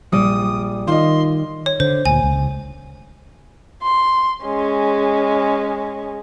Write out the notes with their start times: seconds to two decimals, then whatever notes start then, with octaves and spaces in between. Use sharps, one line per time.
0.12 A#1 G3 D5 D#6
0.87 D#3 F4 D#5 C6
1.66 C#5
1.80 D3 C5
2.06 D2 A#2 G#5
2.23 C#2
3.82 C6
4.43 G#3 C#4